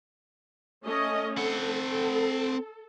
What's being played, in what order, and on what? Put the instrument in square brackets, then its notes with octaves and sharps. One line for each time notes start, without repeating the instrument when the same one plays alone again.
[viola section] A3 C#4 D#5
[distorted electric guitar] C4 F#5 [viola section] A4